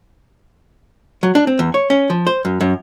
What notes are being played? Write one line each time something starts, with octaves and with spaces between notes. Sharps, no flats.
F#3
D4
C4
E2
C#5
C#4
F3
C5
F#2
F#2